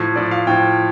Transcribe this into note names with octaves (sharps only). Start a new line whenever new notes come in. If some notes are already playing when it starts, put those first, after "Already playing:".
Already playing: A2 F3
A2 F3 D5
F5
A2 F3 G5